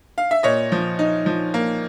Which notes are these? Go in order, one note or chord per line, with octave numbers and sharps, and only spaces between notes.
F5
E5
A#2 C#5 D#5
F3
D#4
F3
A#3